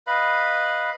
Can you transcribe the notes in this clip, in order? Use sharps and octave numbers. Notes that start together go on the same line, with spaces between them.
B4 D#5 F5 B5